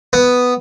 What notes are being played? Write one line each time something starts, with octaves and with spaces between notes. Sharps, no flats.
B3